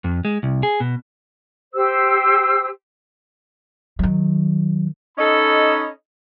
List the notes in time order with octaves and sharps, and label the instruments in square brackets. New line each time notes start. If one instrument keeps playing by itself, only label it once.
[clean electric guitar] F2
G#3
C2
G#4
B2
[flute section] G4 C5 E6
[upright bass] D#3 F#3
[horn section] C#4 D#4 A4 D#5 B5